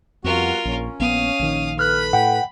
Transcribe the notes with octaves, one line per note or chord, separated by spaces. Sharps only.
F2 G3 B3 F4 F#4 A#4
A#1 C#4
A#1 B3 F5 D#6
A#1 D#3
A4 B4 B5 F6 F#6
A2 F#5 G5